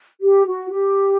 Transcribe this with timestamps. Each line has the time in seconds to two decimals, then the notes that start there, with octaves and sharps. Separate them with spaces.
0.21 G4
0.46 F#4
0.71 G4